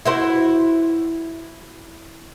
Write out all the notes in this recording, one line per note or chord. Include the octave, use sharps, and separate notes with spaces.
E4 F#4 C5